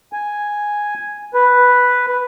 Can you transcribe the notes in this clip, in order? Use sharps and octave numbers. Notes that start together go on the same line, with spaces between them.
G#5
B4